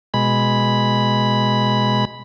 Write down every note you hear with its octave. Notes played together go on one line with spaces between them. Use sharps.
B2 G#3 B5